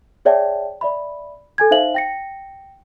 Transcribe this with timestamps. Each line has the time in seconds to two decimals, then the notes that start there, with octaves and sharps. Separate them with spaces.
0.25 G#4 C#5 D5 E5 G5 A5
0.81 D5 E5 B5
1.58 A4 G#5 G#6
1.71 D#4 C5 E5 F5 F#7
1.94 G5 A#6 C#7